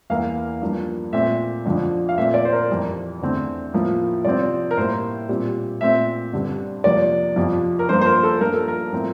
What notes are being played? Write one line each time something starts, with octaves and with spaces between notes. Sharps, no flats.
E2 E3 A#3 F5
G2 F3 A#3
A#2 A3 C4 E5
F2 D3 F3
F5
A#2 A3 C4 E5
D5
C5
A#4
F2 E3 G3
E2 D3 A3 C4
A2 F3 A#3
C3 F3 C4 D5
A#4
A2 G3 A#3 C5
A#2 G3 C4
A#2 A3 C4 E5
G2 D3 G3 C4
F2 C3 F3 A#3 D5
F2 C3 F3
A#4
G2 F3 A#3 C5
C5
A#4
A4
G2 F3 A#3 A#4
A4
A#4
A2 F3 C4